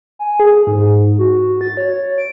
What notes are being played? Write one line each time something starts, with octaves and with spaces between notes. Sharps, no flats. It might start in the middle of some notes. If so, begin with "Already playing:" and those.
G#5
G#4
G#2
F#4
A6
C#5
D7